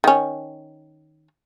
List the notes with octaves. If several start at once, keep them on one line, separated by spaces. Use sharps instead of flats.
D#3 C#4